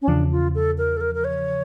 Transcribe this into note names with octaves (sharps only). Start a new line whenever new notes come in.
C#4
E2 C#3 F3 D4
F4
A4
A#4
A4
A#4
A#4
C#5